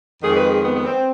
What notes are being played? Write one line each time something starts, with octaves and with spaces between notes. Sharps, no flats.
F2 D#3 G#3 G#4
B4
G#4
B3
B3
C4